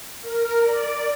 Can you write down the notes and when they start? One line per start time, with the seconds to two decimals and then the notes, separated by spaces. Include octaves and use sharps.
0.21 A#4
0.64 D5